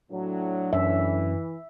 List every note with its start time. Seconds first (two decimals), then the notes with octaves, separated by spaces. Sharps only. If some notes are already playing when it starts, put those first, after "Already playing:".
0.11 A2 F#3 D4
0.73 F#2 E3 E5